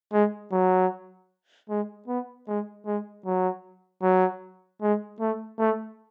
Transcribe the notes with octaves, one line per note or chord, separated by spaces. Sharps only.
G#3
F#3
G#3
B3
G#3
G#3
F#3
F#3
G#3
A3
A3